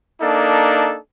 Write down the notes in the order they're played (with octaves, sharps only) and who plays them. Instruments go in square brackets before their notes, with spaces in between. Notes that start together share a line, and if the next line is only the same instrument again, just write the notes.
[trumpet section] A#3 D4 D#4 A4